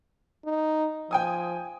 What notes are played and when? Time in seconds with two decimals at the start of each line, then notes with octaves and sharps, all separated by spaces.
0.45 D#4
1.11 F3 G5 G#5 D#6